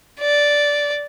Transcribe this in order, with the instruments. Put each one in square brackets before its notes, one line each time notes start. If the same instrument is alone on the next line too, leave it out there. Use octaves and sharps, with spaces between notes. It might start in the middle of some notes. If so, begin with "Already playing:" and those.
[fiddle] D5